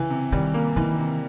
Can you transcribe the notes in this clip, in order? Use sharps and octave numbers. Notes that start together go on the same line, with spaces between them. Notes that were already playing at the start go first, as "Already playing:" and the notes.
Already playing: C#3 E3
C3
D#3 G3
A#3
D#3 E3
C3